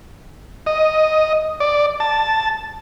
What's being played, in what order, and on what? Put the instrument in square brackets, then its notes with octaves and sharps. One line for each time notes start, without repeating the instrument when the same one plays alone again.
[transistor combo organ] D#5
D5
A5